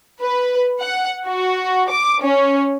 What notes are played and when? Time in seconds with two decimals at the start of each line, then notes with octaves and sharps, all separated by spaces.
0.20 B4
0.80 F#5
1.26 F#4
1.89 D6
2.22 C#4